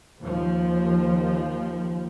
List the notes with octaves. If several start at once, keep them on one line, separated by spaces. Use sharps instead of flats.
D#2 F3